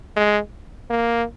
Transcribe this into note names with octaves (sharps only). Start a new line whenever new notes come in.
G#3
A#3